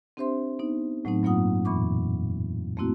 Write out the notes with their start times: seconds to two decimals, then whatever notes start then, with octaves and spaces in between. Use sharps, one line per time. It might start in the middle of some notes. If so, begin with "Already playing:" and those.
0.17 C4 D4 G4 C5 E5 C6
0.59 B3 D#4
1.05 A2 F#3 A3 C4 D#4
1.23 G2 F#3 A#3 F4 F#5 D#6
1.65 F2 A#2 E3 B5 C#6 D6
2.77 A3 A#3 C4 E4 F#4